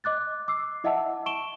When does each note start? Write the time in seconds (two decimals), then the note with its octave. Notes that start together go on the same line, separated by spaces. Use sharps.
0.04 D#5 D6 F#6 A6
0.48 D6 E6 C7
0.84 E4 D#5 E5 F#5 A5 E6
1.26 A5 C#6 D7 E7 G7